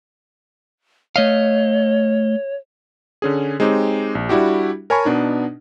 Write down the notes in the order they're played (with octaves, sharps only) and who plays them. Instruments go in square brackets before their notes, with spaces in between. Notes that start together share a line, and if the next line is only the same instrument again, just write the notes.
[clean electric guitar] A3 D#5 F5 [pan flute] C#5
[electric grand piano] D3 C#4 G#4
G#3 C4 D#4 G4 C#5
A#1
G3 D4 E4 F#4 G4
A#4 C#5 G#5 A5 B5 C#6
B2 B3 D4 D#4